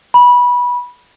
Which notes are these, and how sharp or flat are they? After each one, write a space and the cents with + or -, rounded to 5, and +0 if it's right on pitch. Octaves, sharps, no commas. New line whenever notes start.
B5 -20